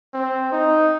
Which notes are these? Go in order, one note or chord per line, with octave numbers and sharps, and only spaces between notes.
C4
D#4